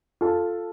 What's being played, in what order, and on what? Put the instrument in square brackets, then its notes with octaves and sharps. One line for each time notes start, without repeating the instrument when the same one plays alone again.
[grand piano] F4 A4